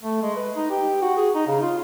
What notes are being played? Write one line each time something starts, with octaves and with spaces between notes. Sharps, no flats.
A3
G#3
B4
D#4
G4
F#4
G#4
D#4
C#3
F4